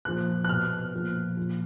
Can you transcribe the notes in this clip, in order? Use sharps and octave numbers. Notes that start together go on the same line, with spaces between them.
A#2 F3 F#6
F#6
B2 F6
A#2 F3
A#2 F3